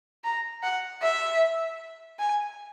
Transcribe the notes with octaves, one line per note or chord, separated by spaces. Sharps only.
A#5
F#5
E5
G#5